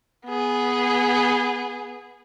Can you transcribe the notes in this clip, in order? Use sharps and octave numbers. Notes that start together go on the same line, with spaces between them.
B3 G#4